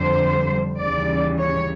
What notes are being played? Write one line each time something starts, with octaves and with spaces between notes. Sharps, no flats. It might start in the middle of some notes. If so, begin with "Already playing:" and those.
Already playing: F2 D3 G3 C5
D#2 C#3 E3 G3 D5
C#5